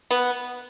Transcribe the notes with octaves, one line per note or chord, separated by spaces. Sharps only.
B3